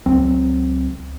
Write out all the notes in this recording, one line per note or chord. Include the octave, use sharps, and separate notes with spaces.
C#2 F#3 C4